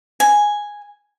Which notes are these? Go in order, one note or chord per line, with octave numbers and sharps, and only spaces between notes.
G#5